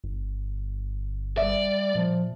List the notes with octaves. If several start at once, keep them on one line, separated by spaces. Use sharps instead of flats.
G1
G3 D5 E5
A#2 F3